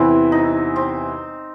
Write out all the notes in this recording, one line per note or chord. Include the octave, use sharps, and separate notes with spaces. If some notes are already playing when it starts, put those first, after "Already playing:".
Already playing: E2 C3 E3 B3 C4 E4
D#4
C4